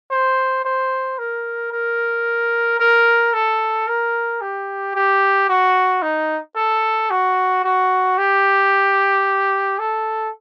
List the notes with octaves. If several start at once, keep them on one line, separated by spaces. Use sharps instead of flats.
C5
C5
A#4
A#4
A#4
A4
A#4
G4
G4
F#4
D#4
A4
F#4
F#4
G4
A4